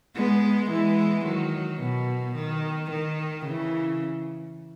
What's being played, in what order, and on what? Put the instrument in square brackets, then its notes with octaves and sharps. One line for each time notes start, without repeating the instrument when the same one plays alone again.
[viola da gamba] G#3 B3
E3 G#3
D#3 F#3
B2
D#3
D#3
C#3 E3